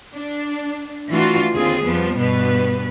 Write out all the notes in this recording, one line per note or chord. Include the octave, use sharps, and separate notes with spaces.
D4
E3 A3 D4 F4 F#4
D#2 D3 C4 F4 G#4
F2 F3 G3 B3
G2 B2 B3 B4